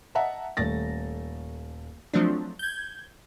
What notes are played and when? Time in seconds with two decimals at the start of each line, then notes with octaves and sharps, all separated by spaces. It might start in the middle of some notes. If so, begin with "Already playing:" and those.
0.15 D#5 E5 F#5 A5 A#5
0.57 D#1 A3 A6 A#6
2.14 F3 F#3 A3 C4 D4
2.59 G6 G#6